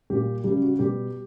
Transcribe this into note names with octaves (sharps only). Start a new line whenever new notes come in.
A#2 G3 G4
C#3 G3 G4
F#4
B2 G3 G4